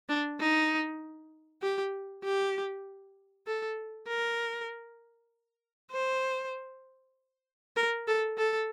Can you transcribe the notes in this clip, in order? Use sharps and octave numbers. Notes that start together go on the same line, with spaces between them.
D4
D#4
G4
G4
A4
A#4
C5
A#4
A4
A4